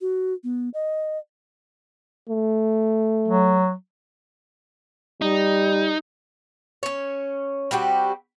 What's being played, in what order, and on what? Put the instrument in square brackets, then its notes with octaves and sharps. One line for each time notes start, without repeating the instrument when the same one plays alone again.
[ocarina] F#4
B3
D#5
[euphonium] A3
[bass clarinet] F#3
[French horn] G3 [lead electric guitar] D#4
[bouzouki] C#4 C#5
G3 C4 F#4 G4